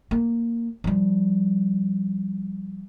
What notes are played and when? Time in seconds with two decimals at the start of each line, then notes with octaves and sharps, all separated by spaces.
0.11 A#3
0.84 F3 G3